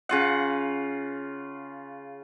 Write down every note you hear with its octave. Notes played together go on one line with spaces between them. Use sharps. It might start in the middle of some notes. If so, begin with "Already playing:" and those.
C#3 F4 F#5